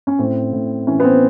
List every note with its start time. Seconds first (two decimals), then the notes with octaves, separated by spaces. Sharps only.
0.07 C#4
0.19 A2 C4
0.53 A2
0.86 E3 C#4
1.00 B3
1.04 C4